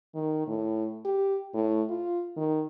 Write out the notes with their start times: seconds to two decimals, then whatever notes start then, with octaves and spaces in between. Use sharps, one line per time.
0.15 D#3
0.47 A2
1.05 G4
1.54 A2
1.90 F4
2.37 D#3